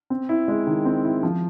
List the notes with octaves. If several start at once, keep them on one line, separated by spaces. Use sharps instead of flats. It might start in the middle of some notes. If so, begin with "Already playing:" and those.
C4
E4
G#3
D#3
C4
E4
F3